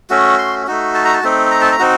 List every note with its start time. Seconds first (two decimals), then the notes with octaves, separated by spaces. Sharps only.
0.10 A3 C#4 F#4
0.38 C6
0.67 A3 D#4 F#4
0.94 A5
1.05 A#5
1.14 A5
1.23 A3 C4 D#4
1.51 A#5
1.61 A5
1.72 A#5
1.79 C4 D#4 F#4